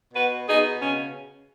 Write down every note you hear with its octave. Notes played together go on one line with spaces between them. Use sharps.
B2 F#4 B4
B2 D#4 G#4
C#3 C#4